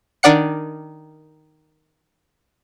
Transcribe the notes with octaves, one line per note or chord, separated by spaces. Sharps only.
D#3 D4 D5 F#5 C#7